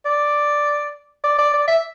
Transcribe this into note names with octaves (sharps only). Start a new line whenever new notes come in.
D5
D5
D5
D5
E5